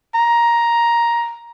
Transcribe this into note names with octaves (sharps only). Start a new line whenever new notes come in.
A#5